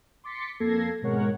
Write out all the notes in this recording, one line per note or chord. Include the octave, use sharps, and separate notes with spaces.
C6 D6 A6 B6 C#7
F2 A#3 A4 G#6 A#6 C7
G#1 B2 G#3 A#4 C#5 F#5